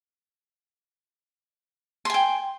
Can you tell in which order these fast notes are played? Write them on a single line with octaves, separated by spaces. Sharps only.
C6 G#5 G5